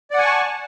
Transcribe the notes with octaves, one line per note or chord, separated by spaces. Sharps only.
D5 F#5 G#5 A5 C#6